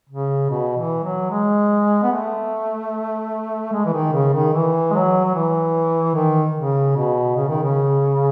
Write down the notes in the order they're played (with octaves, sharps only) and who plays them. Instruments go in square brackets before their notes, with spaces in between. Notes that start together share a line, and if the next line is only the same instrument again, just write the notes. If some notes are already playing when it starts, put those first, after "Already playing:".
[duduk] C#3
B2
E3
F#3
G#3
B3
A3
G#3
E3
D#3
C#3
D#3
E3
G#3
F#3
F#3
E3
D#3
C#3
B2
C#3
D#3
C#3